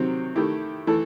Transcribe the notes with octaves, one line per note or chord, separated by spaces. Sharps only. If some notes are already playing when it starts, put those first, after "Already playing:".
Already playing: C3 D#3 F#3 C4
D#3 A3 E4 G4
E3 A3 E4 A4